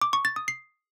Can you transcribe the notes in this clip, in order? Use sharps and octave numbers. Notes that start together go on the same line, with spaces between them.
D6
C#6
A6
D#6
C7